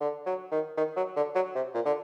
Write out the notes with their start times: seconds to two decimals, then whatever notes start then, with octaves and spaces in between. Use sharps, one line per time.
0.01 D3
0.26 F#3
0.52 D#3
0.77 D#3
0.97 F#3
1.16 D3
1.35 F#3
1.55 C3
1.74 A#2
1.86 D3